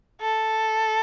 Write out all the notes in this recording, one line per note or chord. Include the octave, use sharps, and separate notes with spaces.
A4